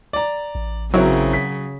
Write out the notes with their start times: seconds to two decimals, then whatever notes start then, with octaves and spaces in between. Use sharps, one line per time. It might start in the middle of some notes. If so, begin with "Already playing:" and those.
0.13 D5 A#5
0.55 A1
0.94 C#3 F#3 C4 E4 A#4
1.33 B6